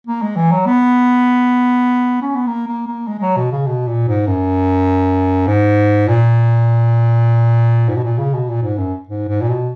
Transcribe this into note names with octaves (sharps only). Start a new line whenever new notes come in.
A#3
G#3
E3
F#3
B3
C#4
B3
A#3
A#3
A#3
G#3
G#3
F#3
B2
C#3
B2
A#2
G#2
F#2
G#2
A#2
G#2
B2
A#2
C#3
B2
A#2
G#2
F#2
G#2
G#2
A#2
B2